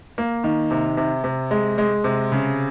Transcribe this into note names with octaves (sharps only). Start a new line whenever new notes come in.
A#3
D#3
C3
C3
C3
G#3
G#3
C3
C#3